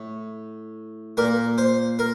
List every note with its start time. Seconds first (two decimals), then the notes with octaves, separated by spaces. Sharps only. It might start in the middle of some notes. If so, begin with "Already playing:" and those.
Already playing: A2
1.17 A#2 A#4
1.58 C5
1.99 A#4